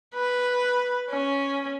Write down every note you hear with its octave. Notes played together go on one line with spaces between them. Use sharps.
B4
C#4